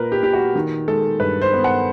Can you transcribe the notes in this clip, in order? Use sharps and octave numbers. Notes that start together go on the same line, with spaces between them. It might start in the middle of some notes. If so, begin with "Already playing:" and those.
Already playing: A#2 A#3 A#4 B4
G4
A#2 G4
F#4
D#3
G#3 A4
G2 B4
C5
B3
F#5